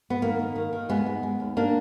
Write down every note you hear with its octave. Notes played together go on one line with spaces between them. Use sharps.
B3
D#3 A#3
D#3
D#3
D#3
D#2 G#3 B3
G#3
G#3
D#2
A#3 D4